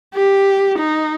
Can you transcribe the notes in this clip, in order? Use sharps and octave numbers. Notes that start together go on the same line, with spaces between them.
G4
D#4